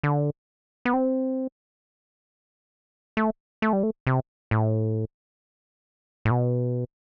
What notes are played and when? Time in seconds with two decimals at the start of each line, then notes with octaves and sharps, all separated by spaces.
0.03 D3
0.85 B3
0.94 C4
3.17 A3
3.62 A3
3.73 G3
3.83 A3
4.07 C3
4.51 A2
6.25 A2
6.31 B2